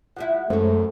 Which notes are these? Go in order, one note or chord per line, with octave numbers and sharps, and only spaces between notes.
F3 G3 E4 F#5
F#2 D#3 G#3 A3 C#4 C5